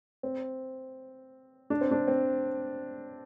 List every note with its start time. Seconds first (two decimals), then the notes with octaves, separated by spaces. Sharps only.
0.23 C4
1.70 D4
1.81 C4
1.91 D4
2.08 C4